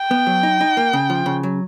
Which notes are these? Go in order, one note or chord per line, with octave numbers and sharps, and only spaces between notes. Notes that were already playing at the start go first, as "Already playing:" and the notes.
Already playing: G5
B3
F#3
D#4
D#4
A#3
C#3
F3
C#3
F#3